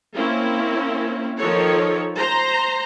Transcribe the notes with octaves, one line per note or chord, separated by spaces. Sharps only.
A#3 C4 C#4 E4
D#3 F3 A4 C#5
C5 A#5